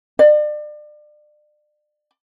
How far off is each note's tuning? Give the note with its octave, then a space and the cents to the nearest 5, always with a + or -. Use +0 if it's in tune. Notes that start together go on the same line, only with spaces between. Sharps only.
D5 +35